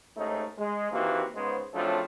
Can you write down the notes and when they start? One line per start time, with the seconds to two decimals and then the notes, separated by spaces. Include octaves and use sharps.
0.17 D#2 G#2 A3 C#4 D#4
0.58 G#3
0.92 D#3 E3 A#3 C4 F#4 G4
1.36 G#2 C#3 G#3 B3 C5
1.74 C#3 F3 F#3 A3 C4 D4